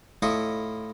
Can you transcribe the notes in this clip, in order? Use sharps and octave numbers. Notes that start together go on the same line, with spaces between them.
A2 E4 F4 D#5 C#6